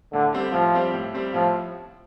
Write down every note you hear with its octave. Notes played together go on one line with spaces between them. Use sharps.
A2 D3
G3 C4 G4
A2 F3
G3 C4 G4
A2
G3 C4 G4
A2 F3